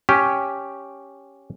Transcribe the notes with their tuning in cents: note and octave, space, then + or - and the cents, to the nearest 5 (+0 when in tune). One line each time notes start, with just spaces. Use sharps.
C#4 +0 G4 +0